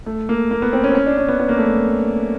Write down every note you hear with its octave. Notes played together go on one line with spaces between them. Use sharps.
A3
A#3
A#3
B3
C4
C#4
C4
C#4
D4
C#4
B3
B3
A#3
A3